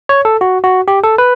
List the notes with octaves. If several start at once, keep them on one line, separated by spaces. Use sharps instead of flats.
C#5
A4
F#4
F#4
G4
A4
B4